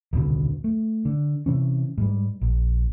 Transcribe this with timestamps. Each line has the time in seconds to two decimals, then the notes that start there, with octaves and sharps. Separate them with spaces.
0.13 D#1 C2 B2 D3
0.64 A3
1.05 D3
1.46 C3 E3 C#4
1.98 G#2 G3
2.41 A#1